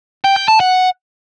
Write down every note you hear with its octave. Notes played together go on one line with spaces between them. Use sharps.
G5
G5
A5
F#5